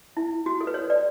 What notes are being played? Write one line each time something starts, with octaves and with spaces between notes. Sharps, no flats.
E4
F#4
A4
B4
C#5
D5